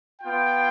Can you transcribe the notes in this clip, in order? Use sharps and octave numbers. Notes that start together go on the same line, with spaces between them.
B3 F4 G5